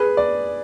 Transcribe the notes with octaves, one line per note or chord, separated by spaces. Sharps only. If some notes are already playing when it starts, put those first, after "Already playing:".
Already playing: G#4 B4
D5